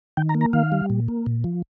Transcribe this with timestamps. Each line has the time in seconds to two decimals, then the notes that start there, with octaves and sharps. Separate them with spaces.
0.17 D#3 G5
0.29 A#5
0.35 A#3
0.41 A#5
0.53 D#3 F5
0.72 G3
0.90 A#2
1.08 A#3
1.26 A#2
1.44 F3